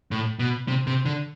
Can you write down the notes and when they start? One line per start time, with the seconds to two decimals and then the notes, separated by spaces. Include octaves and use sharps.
0.11 A2
0.39 B2
0.68 C3
0.87 C3
1.05 D3